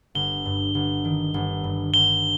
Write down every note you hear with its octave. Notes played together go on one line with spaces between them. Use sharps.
G1 G7
G2
G1
D#3
G1
G2
G1 G7